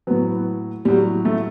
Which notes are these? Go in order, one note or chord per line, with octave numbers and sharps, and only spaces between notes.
A2 F#3 B3
A2 F#3 G3
A3